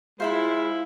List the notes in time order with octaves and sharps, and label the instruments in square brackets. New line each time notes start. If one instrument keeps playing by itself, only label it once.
[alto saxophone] G#3 [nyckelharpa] E4 [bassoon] F4 [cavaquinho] C5 E5 B5